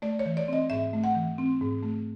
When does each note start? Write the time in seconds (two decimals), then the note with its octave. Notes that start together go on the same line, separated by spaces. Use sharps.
0.02 A3 D5
0.19 C#5
0.26 E3
0.37 D5
0.48 C4 D#5
0.70 G#2 E5
0.93 A3
1.04 F#5
1.15 E3
1.38 C4
1.61 G#2
1.83 A3